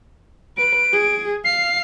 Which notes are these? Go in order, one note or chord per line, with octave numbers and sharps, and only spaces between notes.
B4 D7
G#4
F5 C7